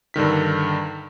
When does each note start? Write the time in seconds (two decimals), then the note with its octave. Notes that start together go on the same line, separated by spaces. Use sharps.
0.14 G2 D3 D#3 B6